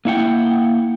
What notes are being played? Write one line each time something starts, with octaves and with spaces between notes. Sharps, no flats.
A#3 E4 F#5 G5